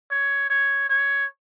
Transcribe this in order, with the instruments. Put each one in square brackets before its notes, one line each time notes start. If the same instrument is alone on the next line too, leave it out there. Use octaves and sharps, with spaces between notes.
[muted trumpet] C#5
C#5
C#5